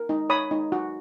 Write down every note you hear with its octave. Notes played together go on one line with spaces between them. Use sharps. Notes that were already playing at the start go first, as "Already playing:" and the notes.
Already playing: A#4
D#4
C#5 B5 D#6
D#4
F#4